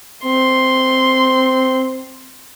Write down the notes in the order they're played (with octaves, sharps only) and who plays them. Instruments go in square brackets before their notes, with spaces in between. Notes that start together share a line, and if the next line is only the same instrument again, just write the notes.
[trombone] C4 [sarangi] C6